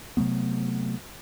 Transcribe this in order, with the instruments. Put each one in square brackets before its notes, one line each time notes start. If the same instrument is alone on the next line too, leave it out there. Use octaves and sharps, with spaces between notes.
[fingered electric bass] C3 F#3 A3 B3